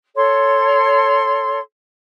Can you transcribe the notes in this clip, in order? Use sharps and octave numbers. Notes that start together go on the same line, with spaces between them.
A4 C#5 C6